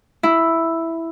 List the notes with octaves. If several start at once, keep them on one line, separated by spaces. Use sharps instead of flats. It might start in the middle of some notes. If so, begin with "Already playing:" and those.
E4